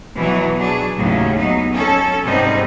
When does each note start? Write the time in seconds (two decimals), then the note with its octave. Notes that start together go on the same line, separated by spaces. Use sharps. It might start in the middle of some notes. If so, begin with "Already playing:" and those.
0.16 B2 E3 F#3
0.56 F#3 D4 G#4
0.96 D#2 A2 C#3 F#3
1.36 F#3 B3 D#4
1.73 C#4 A4
2.24 G#2 C3 G3 B3 C4 D#4